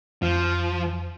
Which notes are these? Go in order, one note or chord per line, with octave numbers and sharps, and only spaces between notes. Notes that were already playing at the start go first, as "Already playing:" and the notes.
F2 F3